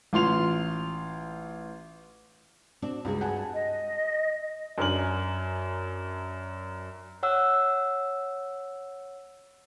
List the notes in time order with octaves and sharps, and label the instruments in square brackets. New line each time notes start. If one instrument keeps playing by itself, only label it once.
[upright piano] A1 F4 C6 F7
[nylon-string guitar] C4 D4 F#4
[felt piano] C#2 [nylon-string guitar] G2 F#4 G#4
[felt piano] F#5 G#5 A5
[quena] D#5
[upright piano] F#2 D4 A#4 G#5 F#7
[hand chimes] C#5 F#5 E6